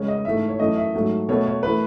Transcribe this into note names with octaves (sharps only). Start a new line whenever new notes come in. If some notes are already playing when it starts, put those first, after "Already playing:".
Already playing: C#2 C#3 G#3 C#5
D#5
G#2 E3 A3 E5
C#5
F#2 E3 A3 D#5
E5
G#2 F#3 A3
B2 A3 C#5
C#5
E3 A3 B4